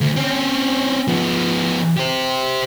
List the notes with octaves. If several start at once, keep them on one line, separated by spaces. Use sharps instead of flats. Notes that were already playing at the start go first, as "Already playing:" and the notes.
D2
C4 C#4
F3 B3
G4 C5